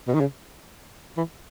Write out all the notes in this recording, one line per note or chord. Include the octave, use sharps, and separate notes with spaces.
B2
D#3
C#3
E3